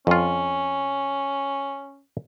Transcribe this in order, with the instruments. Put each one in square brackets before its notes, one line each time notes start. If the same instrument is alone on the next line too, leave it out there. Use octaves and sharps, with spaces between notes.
[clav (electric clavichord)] F2 F4 [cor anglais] C#4